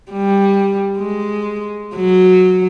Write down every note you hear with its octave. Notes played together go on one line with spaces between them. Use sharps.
G3
G#3
F#3